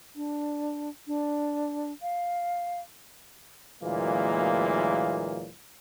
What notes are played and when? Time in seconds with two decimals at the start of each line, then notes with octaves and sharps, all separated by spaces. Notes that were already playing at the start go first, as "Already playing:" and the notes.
0.16 D4
1.07 D4
2.02 F5
3.83 D2 A#2 E3 F#3 G#3 A#3